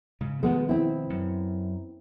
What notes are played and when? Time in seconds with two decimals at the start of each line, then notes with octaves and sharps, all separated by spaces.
0.21 G#2 C#3
0.43 B2 D#3 F3 G#3 B3
0.69 C4 E4
1.10 F#2